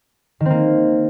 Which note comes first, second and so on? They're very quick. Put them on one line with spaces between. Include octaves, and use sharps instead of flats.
D#3 C4 A#3